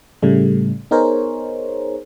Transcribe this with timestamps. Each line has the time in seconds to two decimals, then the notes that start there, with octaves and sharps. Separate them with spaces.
0.22 A2 C#3 G3 A3
0.91 B3 D#4 G#4 A#4 C5 C#5